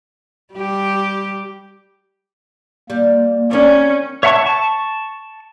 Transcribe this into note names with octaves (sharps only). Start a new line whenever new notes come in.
G3 G4
G3 A#3
C4 C#4 A#4 D5
C#5 E5 F#5 A5 C#6
A5 C#6